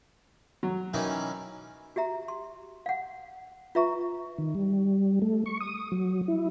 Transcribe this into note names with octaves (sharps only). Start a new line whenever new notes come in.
F#3
D#3 E3 C#4
F#4 G4 E5 A#5
C6
F5 F#5
F4 B4 E5 A#5 C#6
D#3
G3
A3
C#6
D#6
F#3
E4